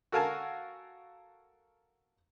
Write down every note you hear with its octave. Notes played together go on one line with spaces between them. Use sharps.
F#4 A4 A#4 F5 G#5 A5